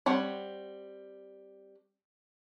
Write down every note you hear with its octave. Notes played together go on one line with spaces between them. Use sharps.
G3 C4 C#5 F#5 B5